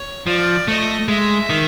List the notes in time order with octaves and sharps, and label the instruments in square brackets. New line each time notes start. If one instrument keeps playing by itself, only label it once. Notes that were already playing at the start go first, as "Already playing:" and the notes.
Already playing: [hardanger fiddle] C#5
[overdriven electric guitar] F3 [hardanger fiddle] D5
[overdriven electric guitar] A3 [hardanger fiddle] D#5
[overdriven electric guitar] G#3 [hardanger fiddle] E5
[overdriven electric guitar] D#3